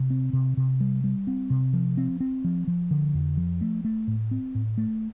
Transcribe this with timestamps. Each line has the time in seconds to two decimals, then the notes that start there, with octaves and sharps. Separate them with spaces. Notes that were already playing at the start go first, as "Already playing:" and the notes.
Already playing: C3
0.10 C4
0.33 C3
0.57 C3
0.80 G3
1.04 G3
1.27 C4
1.50 C3
1.73 F3
1.97 C4
2.20 C4
2.44 F3
2.67 F3
2.91 D3
3.14 F2
3.37 F3
3.61 A3
3.85 A3
4.07 A2
4.31 C4
4.55 A2
4.78 A3